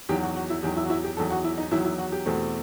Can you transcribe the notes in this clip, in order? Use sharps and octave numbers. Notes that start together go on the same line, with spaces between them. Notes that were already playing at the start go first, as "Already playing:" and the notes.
E2 D#3 F#3 G4
F#4
F#4
E4
E2 D#3 F#3 G4
E4
F#4
E4
G4
E2 D#3 F#3 A4
F#4
E4
D#4
E2 D#3 F#3 E4
E4
F#4
G4
E2 B2 A3 C4